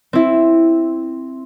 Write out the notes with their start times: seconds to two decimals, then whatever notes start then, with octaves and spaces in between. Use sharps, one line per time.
0.13 C4 E4